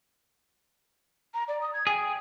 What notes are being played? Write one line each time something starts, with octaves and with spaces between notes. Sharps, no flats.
A#5
D5
D#6
G#6
G#4 G5